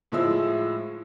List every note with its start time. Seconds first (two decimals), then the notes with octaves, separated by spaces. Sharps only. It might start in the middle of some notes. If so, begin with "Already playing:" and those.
0.12 A2 F3 G#3 E4 E6